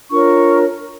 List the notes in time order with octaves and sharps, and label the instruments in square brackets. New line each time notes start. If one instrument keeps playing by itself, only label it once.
[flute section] D4 F4 A#4 C#5 C#6